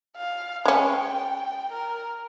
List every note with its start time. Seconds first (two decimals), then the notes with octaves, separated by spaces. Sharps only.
0.17 F5
0.65 G#3 C#4 G5
1.72 A#4